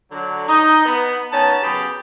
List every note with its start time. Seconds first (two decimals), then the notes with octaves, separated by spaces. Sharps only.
0.12 D3 F#3
0.48 D#4
0.85 B3
1.33 D#3 B3 C#4 A5
1.62 C#3 F#3 B3 G4